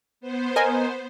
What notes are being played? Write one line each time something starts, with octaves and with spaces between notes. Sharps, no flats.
B3 C5
A#4 D#5 G#5